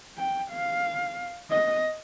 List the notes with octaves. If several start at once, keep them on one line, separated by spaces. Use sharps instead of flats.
G5
F5
D#5